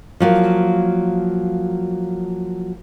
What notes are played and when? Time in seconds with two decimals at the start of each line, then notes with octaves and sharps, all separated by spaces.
0.20 F3 F#3 A#3